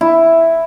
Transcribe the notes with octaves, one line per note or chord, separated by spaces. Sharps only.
E4